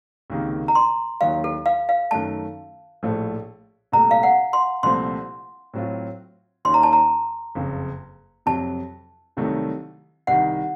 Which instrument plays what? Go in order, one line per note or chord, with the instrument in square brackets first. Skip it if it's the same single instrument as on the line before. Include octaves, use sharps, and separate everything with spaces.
[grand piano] C#2 C3 D#3 A#3
[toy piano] A#5
C6
[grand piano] D#2 D#3 F#3 [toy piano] F5
[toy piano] A4
F5
F5
[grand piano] F#2 D#3 A3 [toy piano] A5
[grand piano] A#1 A2 F3 A3
[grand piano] C2 A#2 A3 [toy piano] A#5
[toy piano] F5
F#5
C6
[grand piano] C2 A#2 F3 A3 C4 [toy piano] C6
[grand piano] A2 F#3 C4 F4
[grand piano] D#2 D#3 A#3 C#4 [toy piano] C6
[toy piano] A#5
A5
A#5
[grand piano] F#1 F2 C#3
[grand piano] F2 C3 F#3 [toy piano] A5
[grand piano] C2 C3 D#3 F#3 A3
[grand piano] C2 C3 D#3 [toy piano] F#5